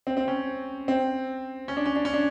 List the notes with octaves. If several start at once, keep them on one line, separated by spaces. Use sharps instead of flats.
C4
C4
C#4
C4
C#4
D4
C#4
D4
C#4
D4